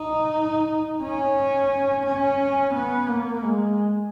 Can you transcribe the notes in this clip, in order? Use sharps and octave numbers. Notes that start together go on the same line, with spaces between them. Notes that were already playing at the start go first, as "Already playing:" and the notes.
Already playing: D#4
C#4
C#4
B3
A#3
G#3